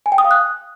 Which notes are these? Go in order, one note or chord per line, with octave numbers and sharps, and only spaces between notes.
G#5
G5
D#6
F5
F#6